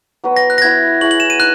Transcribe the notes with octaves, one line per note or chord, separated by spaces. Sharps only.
F#3 B3 F#4 B4
A#6
F#6
A#6
B3 E4 B4 E5 G#6
E4 G#4 C#5 F#7
F#7
E7
D#7
D#4 F#6